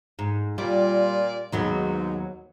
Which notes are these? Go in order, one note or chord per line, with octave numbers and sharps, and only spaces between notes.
G#2
A#2 G3 F4 D5
D#2 G#2 F#3 B3